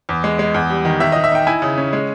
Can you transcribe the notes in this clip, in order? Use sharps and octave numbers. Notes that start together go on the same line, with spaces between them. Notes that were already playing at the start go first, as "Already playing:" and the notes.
E2
G#3
G#3
E2
G3
D#3
D#3 E5
D#3 D#5
E5
D#4 G5
E4 G#5
C#3
C#4
G#3